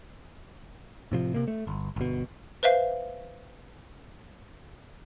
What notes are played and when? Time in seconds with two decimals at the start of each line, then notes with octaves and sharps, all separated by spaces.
1.12 A2 C3 F3
1.34 C3 A#3
1.48 A3
1.67 G1
1.96 G1 B2
2.63 B4 C5 E5 F5